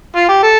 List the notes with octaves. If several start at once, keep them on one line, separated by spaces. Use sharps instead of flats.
F4
G4
A4